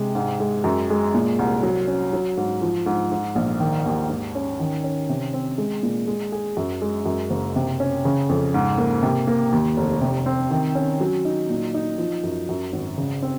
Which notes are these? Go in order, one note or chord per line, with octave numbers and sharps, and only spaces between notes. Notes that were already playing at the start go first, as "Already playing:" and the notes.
Already playing: C3 G#3
G#2
G#3
F#2
G#3
A#2
C2
F#3
C#4
F#3
G#2
F3
G#2
G#2
A#1
D#3
D#2
G#2
C#4
D#3
C#4
C3
C4
G#3
A#2
G#3
G#4
F#2
G#3
F#2
F#1
C3
C#4
C#3
F2
G#2
A#3
C3
A#3
D#2
F1
C3
C4
D#3
C#4
F#3
D#4
A#2
D#4
F3
F#2
F#2
G#1
C#3
C4